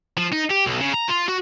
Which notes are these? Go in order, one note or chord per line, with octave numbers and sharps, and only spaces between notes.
F3
D#4
G4
B1
C#3
A#5
F4
F#4